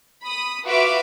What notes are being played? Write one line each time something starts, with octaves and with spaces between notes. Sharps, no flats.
B5 D#6
F4 F#4 B4 E5 F5 D6